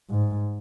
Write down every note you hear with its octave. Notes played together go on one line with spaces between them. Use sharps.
G#2